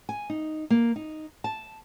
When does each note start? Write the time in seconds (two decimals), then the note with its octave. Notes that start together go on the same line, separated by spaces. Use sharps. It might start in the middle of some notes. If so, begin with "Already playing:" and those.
0.09 G#5
0.30 D#4
0.70 A#3
0.96 D#4
1.44 A5